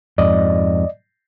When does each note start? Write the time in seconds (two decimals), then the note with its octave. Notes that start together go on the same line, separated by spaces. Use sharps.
0.18 F2 G#2 D5 D#5